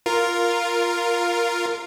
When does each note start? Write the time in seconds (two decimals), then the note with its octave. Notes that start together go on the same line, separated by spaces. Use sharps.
0.06 F4 A#4